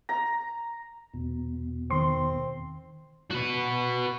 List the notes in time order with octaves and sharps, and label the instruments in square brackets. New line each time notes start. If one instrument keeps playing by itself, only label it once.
[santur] A#5
[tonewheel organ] E2 B2
[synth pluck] D#3 C6 [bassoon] C4
[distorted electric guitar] F#4 B4